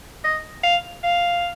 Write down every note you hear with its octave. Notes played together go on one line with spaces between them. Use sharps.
D#5
F5
F5